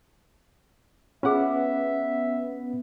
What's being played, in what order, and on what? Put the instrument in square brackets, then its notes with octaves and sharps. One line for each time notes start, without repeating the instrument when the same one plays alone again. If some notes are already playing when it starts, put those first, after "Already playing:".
[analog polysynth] B3 [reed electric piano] C#4 F#5 [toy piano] F4 G#4 [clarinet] E5